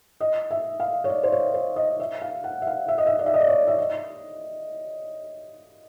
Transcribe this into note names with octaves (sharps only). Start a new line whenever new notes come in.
D#5
E5
F5
C#5
D5
C5
C#5
C5
D#5
E5
F5
F#5
E5
F5
E5
D#5
E5
D5
E5
D#5
D5
C#5
E5
D#5